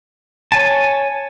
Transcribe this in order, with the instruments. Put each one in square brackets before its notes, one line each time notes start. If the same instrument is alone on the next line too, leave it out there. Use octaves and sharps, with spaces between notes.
[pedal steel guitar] C#5 G#5 A5